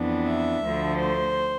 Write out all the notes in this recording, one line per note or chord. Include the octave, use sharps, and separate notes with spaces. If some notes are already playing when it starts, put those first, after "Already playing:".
Already playing: F2 E3 B3 D4
E5
D2 D3 F3 A3
C5